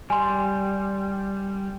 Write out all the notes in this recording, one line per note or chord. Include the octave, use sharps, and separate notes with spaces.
G3 G#5 C6